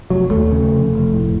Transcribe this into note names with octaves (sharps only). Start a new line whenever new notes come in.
F1 F#3
D#2 A3
C#3
F1
F1
A2